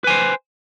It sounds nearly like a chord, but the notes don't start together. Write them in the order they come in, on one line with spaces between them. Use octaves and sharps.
B4 G#5 C5